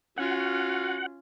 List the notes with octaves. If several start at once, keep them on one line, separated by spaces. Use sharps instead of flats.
C#4 F4 F#4 F#5